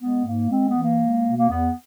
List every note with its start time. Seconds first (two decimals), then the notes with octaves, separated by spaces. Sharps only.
0.01 G#3 B3
0.25 G#2 A#3
0.50 G#3 C4
0.67 B3
0.75 E3
0.82 A#3
1.00 G#3
1.23 B2
1.37 A#3
1.48 E2 B3